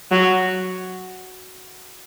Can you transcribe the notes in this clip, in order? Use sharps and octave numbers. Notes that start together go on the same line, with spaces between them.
F#3